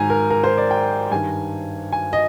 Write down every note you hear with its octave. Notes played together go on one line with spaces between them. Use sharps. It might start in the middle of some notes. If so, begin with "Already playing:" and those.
Already playing: G#2 D#3 G#5 A#5
A#4
A#4
C5
D5
G5
G2 D#3 G#5
G#5
D#5